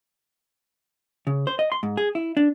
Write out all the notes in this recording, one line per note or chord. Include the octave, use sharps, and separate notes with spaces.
C#3
C5
D#5
C6
G#2
G#4
E4
D4